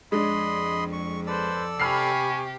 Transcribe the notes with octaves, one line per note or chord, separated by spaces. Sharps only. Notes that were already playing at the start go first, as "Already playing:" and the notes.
F2 G#3 D4 D#5 B5 C6
C#6
A4 B4 C5 D5 E6
C3 G4 G#5 B5 C#6 F6 C7